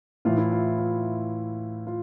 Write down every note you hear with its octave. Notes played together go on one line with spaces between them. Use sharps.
A2 E3 F4
E4
F4
F4
F4